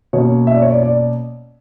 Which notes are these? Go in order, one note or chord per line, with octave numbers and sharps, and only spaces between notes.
B2 A#3 C#4 C#5
E5
D5
C#5
D5
D5